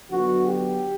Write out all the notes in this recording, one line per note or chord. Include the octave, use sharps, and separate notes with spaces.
D3 F#3 B3 F#4
G4